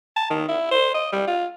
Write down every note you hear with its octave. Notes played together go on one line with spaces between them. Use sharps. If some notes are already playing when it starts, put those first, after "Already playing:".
A5
D#3
E4
C5
D#5
G3
F4